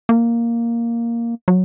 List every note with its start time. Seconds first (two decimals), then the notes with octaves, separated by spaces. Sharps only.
0.09 A#3
1.48 F#3